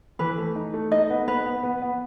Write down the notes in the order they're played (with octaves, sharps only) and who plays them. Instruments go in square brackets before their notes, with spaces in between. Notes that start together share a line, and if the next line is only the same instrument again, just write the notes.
[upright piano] E3 [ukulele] B4
[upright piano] A3
D#4
A3
[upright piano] D#4 [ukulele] D#5
[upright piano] B3
[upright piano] B3 [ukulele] B4
[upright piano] B3
B3
B3